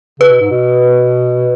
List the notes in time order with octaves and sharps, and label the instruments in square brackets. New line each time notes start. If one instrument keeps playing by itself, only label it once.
[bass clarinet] C#3 [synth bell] B4
[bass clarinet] B2
G#2
B2